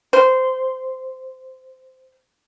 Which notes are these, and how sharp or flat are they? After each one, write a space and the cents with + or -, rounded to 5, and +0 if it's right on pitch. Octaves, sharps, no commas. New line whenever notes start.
C5 -15